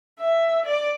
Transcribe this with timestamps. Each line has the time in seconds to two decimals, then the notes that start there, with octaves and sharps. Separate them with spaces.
0.20 E5
0.66 D5